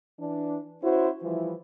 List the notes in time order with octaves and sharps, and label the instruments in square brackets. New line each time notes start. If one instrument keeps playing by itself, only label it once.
[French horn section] E3 D4
C#4 E4 F#4 C5
E3 F3 G3 E4